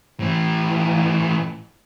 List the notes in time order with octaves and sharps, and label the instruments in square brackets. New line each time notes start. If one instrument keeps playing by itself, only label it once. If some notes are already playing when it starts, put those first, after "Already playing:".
[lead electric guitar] A2 E3